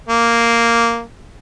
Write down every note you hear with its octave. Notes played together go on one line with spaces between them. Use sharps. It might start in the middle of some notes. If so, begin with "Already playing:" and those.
A#3